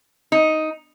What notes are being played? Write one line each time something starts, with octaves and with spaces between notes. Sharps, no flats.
D#4